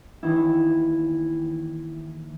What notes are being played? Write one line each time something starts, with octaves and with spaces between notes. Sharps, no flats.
D#2 D#3 E3 E4